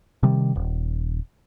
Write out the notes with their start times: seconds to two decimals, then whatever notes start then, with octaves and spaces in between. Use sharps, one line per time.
0.23 C3 D#3 G3
0.56 D#1